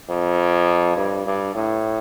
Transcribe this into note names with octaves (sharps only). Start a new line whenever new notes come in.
F2
G2
G2
A2